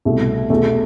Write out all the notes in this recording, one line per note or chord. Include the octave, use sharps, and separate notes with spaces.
C2 B2 A3
E2 B2 A3